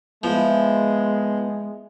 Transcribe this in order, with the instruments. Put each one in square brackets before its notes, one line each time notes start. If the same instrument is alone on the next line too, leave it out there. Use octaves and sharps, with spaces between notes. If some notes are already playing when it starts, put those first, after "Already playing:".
[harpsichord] F3 [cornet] G#3 [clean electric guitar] B3 [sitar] E4